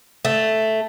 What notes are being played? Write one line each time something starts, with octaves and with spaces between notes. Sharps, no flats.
A3